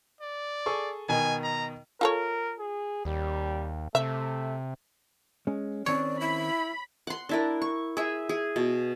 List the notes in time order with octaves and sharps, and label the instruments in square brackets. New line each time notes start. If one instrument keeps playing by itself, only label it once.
[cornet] D5
[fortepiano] G#4 A4 C#6
[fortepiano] B2 D#3 [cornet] G#5
[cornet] A#5
[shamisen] F4 A4 C#5 [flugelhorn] A#4
[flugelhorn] G#4
[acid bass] D#2 [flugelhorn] G3
[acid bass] C3 [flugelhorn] A3 [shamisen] E5
[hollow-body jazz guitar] G#3 C#4
[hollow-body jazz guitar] D#3 C4 C#4 [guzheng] C#5 [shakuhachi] D5
[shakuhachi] E4 [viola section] B5
[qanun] F#5 C6
D4 E4 A#4
C#6
G#4 E5
G#4
B2